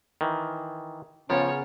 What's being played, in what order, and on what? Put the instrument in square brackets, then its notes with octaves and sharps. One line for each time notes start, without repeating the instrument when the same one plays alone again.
[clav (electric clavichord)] D#3 E3
[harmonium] C#3 C#4 [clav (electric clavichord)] F3 [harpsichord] B3 F4 A#4 [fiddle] C#5